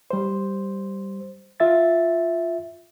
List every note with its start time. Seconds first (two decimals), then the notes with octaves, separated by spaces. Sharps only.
0.11 G3 C5
1.60 F4 E5 A6